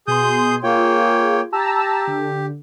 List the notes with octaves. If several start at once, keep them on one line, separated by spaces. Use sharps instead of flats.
B2 G#4 C6 D#6 G6
A#3 F4 G#4 C#5 G5
G4 A5 A#5 E6
D3